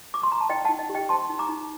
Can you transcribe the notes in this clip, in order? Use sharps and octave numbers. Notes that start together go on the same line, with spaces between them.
D6
C6
A#5
A5
D#4 D#5 G5
D#4 F#5 A5
D#5
G4
D#5 G5
C5 A5 C6
D#4
A#5 D6
D#4